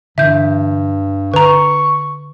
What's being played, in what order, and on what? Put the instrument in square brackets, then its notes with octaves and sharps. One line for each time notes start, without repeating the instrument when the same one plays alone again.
[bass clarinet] G2 [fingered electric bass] D3 E3 [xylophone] E5 G6
[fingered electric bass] D3 [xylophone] B4 A#5 [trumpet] C#6